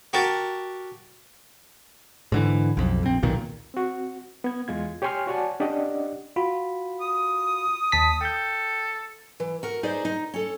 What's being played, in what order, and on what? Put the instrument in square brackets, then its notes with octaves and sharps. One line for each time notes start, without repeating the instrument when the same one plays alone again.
[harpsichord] F#4 G4 A#4 A5
[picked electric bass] G#2 D3 E3
B1 F2
A#1 C4
B1 E2 A#2 D#3
[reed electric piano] C4 F#4
B3 G#6
E2 G#3 F4 G#6
G4 C#5 G5 G#5 C6 F6
F#4 C#5 D5 F#5 G#5 A5
C#4 D4 G4 D5 D#5 F#5
[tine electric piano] F4 F#4 B5
[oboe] D#6
[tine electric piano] D#2 A5 B6
[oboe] A4 [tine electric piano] G5 G6
[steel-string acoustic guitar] E3
F#4 A#4
D#4 G#4 B4 C5 D5
D#4
C#4 A4